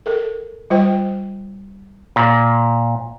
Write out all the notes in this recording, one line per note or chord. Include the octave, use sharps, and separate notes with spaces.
A4 A#4
G3 F4 C5 G5
A#2